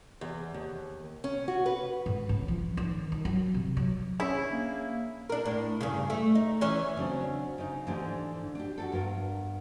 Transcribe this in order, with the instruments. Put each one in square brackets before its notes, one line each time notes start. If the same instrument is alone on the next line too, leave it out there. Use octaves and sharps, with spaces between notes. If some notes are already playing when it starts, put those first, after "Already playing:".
[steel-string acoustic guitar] E2
D#2
C#4
F#4
B4
[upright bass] G#2
C#3
F3
D#3
D#3
F#3
C3
F#3
[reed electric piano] C#4 D4 G#4 [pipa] E4
[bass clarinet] A#3
[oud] D4 A#4
A2
G2 C#3
A3
D#4
E3 C#4 C#5
[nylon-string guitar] C#3 F#3 C4 D4
C#3 D#4
G#2 D3 E3 D4 G4
D4 G4
F#4 G4 A4
G2 B3 A#4